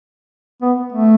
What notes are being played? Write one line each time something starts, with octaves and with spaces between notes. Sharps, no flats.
B3
A3